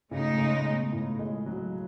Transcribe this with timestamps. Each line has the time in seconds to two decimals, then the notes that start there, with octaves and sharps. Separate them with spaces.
0.11 A2 C#3 G#3 D#4
0.38 C#3
0.65 B2
0.92 A2
1.19 G#3
1.46 F#3